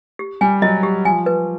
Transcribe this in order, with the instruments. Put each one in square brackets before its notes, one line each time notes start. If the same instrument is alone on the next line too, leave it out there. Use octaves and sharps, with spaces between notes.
[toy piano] G4
[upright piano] G3 [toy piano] G#5
[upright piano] F#3 [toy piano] D#5
[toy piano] G4
[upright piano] F3 [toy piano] G#5
[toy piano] B4